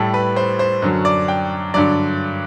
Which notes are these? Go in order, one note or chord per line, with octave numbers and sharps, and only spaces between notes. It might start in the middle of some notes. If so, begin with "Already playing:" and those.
Already playing: A2 G3 A4
B4
C5
C5
F#2 D3 F#3
D5
G5
G2 D3 F#3 D5